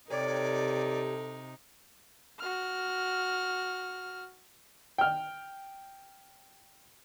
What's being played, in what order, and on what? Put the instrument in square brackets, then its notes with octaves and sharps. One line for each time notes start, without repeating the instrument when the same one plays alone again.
[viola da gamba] C3 D#4 [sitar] G4 A#4 C#5 [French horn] A4 [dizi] D5
[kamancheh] F#4 F6
[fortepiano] G5 F6